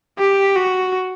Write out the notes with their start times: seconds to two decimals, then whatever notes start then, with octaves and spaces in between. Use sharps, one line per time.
0.19 G4
0.56 F#4